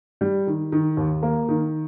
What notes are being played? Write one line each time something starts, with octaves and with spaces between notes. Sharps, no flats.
G3
D#3
D#3
D#2
A#3
D#3